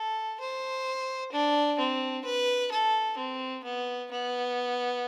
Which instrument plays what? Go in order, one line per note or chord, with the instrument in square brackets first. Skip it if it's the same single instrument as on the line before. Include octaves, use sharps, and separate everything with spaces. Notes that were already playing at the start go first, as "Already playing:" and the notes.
Already playing: [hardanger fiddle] A4
C5
D4
C4
B4
A4
C4
B3
B3